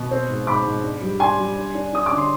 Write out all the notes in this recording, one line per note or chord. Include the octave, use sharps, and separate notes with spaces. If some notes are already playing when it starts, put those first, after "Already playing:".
Already playing: B2
C4
G#2
G#2 B5 D6
G#2
D4
G3
D4 G#5 C6
G3
D4
D4
D4 D#6
D6
D3
C6